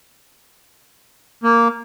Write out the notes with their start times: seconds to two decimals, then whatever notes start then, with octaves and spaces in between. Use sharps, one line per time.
1.44 A#3